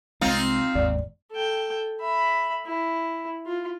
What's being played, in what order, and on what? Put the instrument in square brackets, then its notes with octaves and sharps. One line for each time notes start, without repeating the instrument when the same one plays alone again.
[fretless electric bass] C2 G#3 [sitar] C4 D#4 F4
[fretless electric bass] G1 D#2 G#2 [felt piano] D5
[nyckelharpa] A4 G5
E5 B5
E4
F4